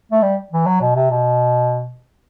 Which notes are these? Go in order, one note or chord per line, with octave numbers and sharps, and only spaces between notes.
A3
G3
E3
F#3
B2
C3
B2